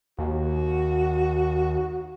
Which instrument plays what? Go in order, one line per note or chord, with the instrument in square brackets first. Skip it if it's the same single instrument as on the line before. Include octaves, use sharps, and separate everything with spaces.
[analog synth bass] D#2 [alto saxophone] F#4